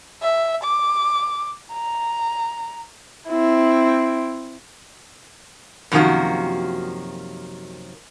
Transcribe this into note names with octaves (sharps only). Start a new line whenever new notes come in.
E5
D6
A#5
C4 E4
F#2 C3 D#3 F3 A#3 F#4